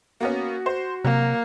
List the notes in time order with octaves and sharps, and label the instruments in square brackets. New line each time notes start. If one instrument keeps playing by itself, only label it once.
[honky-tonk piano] A#3 B3 C#4 [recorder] F#4
[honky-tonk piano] C5
[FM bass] C3 [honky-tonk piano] F#3 [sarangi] A#3